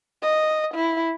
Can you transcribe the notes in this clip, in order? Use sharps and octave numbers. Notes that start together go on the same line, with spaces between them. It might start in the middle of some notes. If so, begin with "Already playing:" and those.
D#5
E4